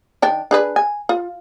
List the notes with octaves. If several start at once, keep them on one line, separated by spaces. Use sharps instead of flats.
D#3 D4 G5
D4 G#4 B4
G#5
F4